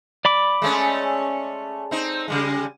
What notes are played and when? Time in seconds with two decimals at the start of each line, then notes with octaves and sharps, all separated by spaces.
0.25 D5 B5 D6
0.62 G#3 A3 C#4
1.91 C4 D#4
2.28 C#3 G3 G#3